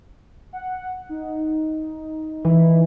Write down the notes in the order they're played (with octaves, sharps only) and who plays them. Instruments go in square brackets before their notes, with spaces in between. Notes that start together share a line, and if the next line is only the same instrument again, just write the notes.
[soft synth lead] F#5
D#4
[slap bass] E3